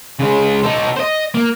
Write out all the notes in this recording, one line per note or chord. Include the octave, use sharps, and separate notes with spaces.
C#3 G#3
D#4 A4
C5 D#5
A#3